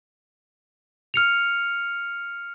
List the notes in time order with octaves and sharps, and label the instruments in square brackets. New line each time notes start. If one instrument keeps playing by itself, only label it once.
[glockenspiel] F6 C#7 F7